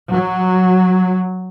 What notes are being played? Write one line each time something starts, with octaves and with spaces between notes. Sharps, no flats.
F#3